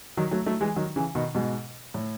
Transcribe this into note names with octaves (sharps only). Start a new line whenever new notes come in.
D#3 F#3
F#3 A3
F#3 A3
E3 G#3
D#3 F#3
C#3 E3
B2 D#3
G#2 B2
A2